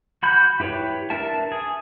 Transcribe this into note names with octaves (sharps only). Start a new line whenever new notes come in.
F#4 B5 G6
E4 G4 B4 C#5
D4 A#4 E5 A5
G#4